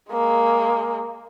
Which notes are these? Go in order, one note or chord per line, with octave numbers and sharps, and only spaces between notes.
G#3 A#3